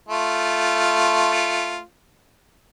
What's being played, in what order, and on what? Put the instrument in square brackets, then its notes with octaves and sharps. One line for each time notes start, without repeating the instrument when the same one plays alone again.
[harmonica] A3 F4